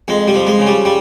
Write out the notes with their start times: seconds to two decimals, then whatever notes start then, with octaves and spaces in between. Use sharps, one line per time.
0.08 F2 G#3
0.28 G3
0.34 F3
0.47 G#3
0.59 C#3
0.67 G3
0.85 G3